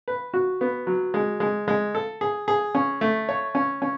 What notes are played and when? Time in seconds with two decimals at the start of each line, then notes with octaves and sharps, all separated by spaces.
0.08 B4
0.34 F#4
0.61 B3
0.87 F#3
1.14 G#3
1.40 G#3
1.68 G#3
1.95 A4
2.21 G#4
2.48 G#4
2.75 C#4
3.01 A3
3.29 C#5
3.55 C#4
3.82 C#4